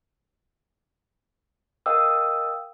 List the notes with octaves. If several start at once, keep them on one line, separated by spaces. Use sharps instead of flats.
A#4 D#5 F5 G5 D#6 E6